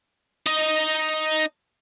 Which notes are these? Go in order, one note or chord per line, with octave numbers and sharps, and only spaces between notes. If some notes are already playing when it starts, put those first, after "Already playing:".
D#4 D#5